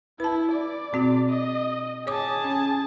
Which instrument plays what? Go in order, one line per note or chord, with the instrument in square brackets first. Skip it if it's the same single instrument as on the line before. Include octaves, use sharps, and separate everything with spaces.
[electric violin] E4 [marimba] B4 A5
[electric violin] D5
[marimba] B2 C4 F#4
[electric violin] D#5
[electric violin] G#4 A5 [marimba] C#5 D6 D#6
[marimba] C#4